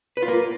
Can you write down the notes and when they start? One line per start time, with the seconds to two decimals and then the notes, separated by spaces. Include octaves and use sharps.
0.17 B4
0.23 F4
0.28 A#3